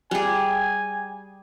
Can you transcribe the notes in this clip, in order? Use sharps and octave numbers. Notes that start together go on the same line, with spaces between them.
G3 G#4 G#5